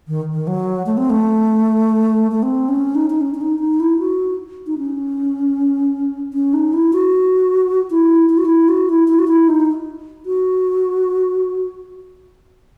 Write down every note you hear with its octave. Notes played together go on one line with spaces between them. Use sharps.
D#3
D#3
F#3
A3
C4
A3
A3
C4
C#4
D#4
D#4
C#4
C#4
D#4
D#4
E4
F#4
D#4
C#4
C#4
D#4
E4
F#4
E4
E4
F#4
E4
F#4
E4
E4
F#4
E4
D#4
F#4